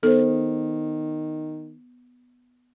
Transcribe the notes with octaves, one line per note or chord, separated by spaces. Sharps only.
D#3 B3 A4 C5